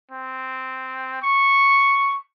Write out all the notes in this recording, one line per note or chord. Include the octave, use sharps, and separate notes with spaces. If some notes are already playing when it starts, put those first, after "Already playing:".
C4
C#6